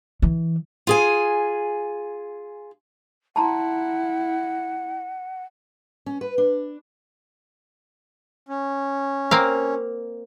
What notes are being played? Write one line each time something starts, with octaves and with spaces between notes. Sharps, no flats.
E3
F4 G#4 G#5
E4 F#5 A5 A#5 C6
C#4
B4
D4
C#4
A#3 C4 F5